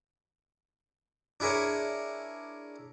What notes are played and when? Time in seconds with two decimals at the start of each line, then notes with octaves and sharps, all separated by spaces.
1.40 D4 E4 G#4 A#4 C#5